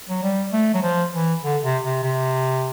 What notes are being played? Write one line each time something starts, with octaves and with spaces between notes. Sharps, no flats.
F#3
G3
A3
F#3
F3
E3
D3
C3
C3
C3